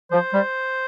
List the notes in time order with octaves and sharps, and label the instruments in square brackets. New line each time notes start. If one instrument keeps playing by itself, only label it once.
[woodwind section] F3 [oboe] C5
[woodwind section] G3